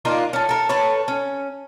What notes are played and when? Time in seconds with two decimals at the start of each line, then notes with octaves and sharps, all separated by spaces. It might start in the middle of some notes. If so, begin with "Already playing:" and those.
0.05 A#3 D4 D#4 F4
0.33 C#4 A4
0.49 A4 A#4
0.69 A4 B4 C#5
1.08 C#4